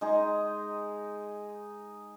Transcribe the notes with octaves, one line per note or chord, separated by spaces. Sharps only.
G#3 D#4 G#4